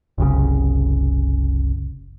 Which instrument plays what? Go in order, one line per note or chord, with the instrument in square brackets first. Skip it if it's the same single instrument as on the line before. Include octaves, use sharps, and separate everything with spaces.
[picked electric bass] F#1 C2 C#3